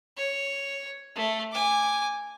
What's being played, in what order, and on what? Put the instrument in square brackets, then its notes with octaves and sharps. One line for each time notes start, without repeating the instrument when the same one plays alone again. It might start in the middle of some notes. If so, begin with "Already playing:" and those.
[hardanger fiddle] C#5
A3
G#5 D6